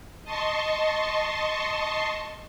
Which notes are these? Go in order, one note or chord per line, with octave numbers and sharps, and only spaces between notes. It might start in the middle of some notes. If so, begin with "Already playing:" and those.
D#5 A5 C6 C#6